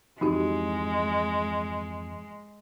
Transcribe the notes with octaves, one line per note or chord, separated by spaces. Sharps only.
F2 G#2 E3 G#3 D#4 F#4 G4